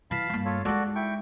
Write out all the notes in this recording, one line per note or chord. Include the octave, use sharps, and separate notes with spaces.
E3 E4 F5 A5 B5
G2 A#3
F4 A4 C#5
G#3 D#4 F#4 A4 D5
E4 G5 C#6